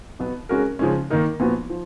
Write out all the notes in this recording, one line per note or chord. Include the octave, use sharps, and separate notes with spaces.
B2 F#3 B3
G#3 C#4 F#4 A#4
C#3 F3 G#3 C#4
D#3 A#3 D#4 A#4
A#2 F3 B3 F#4
F3